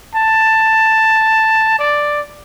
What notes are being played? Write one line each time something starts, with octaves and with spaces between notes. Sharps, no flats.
A5
D5